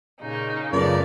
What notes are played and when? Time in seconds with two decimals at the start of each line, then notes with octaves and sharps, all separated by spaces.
0.20 A#2 C#3 D#4
0.73 F#2 C#3 A3 B3 F4 A#4 D5